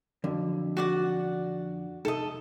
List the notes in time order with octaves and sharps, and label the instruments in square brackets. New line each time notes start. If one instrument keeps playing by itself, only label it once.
[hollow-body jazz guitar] F2 D3 [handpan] F#3 C4
[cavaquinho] F#4 D5 F#5
[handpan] C3 D#4 [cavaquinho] A4 D#5